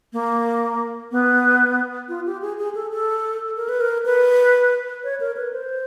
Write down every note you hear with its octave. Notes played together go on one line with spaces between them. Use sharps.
A#3
B3
F4
G4
G#4
G#4
A4
A4
A#4
B4
A#4
B4
C#5
A#4
B4
C5